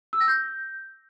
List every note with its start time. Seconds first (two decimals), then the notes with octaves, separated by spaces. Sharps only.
0.13 E6
0.20 A#6
0.28 G6